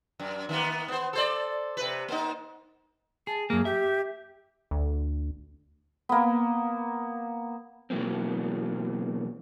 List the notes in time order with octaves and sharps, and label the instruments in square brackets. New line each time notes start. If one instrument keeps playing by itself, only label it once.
[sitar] F#2
D#3 A#3 B3
B3 C5
A4 C5 D5
C3 B4
A#3 D#4
[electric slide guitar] G#4 [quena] A5
[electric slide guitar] F#2 A#3 [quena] G#4
[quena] G4 [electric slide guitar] E5
[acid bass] D2
[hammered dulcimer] A#3 B3
[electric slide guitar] B2 E3 F#3 A#3 C4